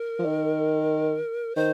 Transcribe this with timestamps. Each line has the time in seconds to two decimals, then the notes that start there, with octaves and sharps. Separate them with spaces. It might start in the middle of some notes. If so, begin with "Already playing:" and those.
Already playing: A#4
0.19 F3
0.25 D#3
1.55 D#3 C5